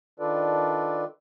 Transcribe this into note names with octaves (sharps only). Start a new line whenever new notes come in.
D#3 D4 F4 A4 B4 D5